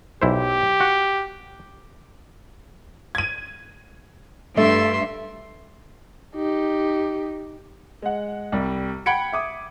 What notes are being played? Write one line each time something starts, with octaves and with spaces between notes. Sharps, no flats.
B1 E4 G4 C5
F#4
G#6 D#7
G2 A3 A4 E5 C6
D#4 G4
G#3 F#5
C2 G3
F#5 G5 B5 G#6 C#7 D7
E5 D6 D#6